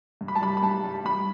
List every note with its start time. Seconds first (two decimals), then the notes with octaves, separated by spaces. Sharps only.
0.21 G2
0.28 B5
0.36 A5
0.41 G3 B5
0.57 B5
0.62 G2 A5
0.84 G3
1.05 G2 B5